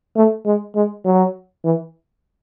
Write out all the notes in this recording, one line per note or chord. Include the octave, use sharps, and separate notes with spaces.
A3
G#3
G#3
F#3
E3